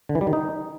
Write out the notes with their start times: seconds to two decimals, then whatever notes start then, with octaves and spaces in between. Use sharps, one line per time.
0.09 D3
0.15 E3
0.21 G3
0.27 D#3
0.33 D#4